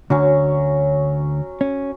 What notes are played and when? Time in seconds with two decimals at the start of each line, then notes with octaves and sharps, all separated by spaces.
0.10 D2 D3 F#3 C#4
1.61 C#4